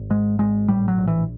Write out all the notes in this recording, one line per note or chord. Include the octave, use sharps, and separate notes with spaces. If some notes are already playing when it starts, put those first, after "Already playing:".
Already playing: G#1
G#2 G#3
G#1 G#3
A2 G3
F#3
A#1
E3